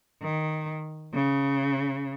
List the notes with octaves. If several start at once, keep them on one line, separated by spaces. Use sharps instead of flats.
D#3
C#3